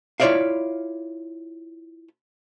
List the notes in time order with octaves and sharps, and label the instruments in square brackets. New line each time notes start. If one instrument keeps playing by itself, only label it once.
[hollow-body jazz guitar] E4 F4 C#5 D5 E5 F5